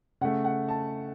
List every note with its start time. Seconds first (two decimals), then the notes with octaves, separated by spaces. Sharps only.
0.21 C#3 A3 F#5
0.44 F#5
0.69 A5